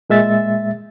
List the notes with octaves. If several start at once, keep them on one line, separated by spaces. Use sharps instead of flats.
A#2 G#3 E5 A6